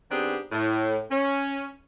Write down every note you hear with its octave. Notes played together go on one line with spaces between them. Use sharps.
D#3 B3 C4 D4 G4 G#4
A2
C#4